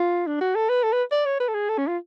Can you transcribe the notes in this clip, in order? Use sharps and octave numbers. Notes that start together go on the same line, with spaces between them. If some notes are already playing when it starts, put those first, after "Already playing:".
Already playing: F4
D4
F#4
A4
B4
A4
B4
D5
C#5
B4
A4
G#4
A4
C#4
F4